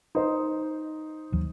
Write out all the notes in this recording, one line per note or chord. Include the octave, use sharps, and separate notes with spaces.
D#4 C5
D#2 E3 F#3